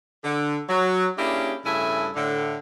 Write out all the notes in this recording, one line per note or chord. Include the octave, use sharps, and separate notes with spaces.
D3
F#3
A#3 C#4 D4 E4 G4 G#4
G2 C#3 A3 E4 E5 G#5
A2 D3